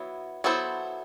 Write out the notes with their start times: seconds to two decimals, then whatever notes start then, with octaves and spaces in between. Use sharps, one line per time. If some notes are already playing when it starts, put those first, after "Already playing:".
Already playing: F#3 B3 E4
0.44 F#3 B3 E4 A4 C5